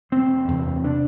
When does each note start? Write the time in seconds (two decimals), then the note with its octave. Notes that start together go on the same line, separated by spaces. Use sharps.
0.12 E1 C4
0.48 E2 C3
0.84 D4